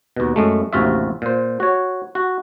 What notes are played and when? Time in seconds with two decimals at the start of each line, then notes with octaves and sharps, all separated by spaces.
0.16 D#2 B2
0.36 F#2 G#3 A3
0.73 A1 D#2 C3 F4 F#4 E5
1.22 A#2 C5
1.60 F#4 C#5
2.15 F#4